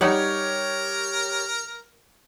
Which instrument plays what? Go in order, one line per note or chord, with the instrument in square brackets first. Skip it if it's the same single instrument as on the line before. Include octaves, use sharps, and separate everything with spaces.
[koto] G3 D#4 F#5 [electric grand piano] G4 C#5 [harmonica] A#4